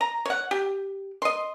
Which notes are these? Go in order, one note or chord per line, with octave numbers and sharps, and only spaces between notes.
A#5
C#5 F#5
G4
D#5 C6